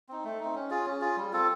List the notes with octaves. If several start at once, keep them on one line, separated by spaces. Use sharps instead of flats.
C4 D#4
A3
C4 D#4
C#4
F4 G#4
C#4
F4 G#4
G3
C4 F4 A4